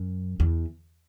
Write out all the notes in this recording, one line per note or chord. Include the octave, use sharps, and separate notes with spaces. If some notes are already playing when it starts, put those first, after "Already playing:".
Already playing: F#2
E2